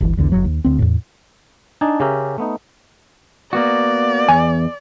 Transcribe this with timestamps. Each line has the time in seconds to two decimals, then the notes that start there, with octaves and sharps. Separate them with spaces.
0.01 D1 G1 E3
0.17 B1 E2 D3
0.32 F#1 B1 F#3
0.44 D#2
0.64 D2 C4
0.79 E2 A2
1.81 D4 D#4 G#5 A5
2.00 C#3 C#4 G4 A#4 E5
2.38 A3 B3 D#4
3.53 A#3 B3 F#4 D5
4.29 E2 G#5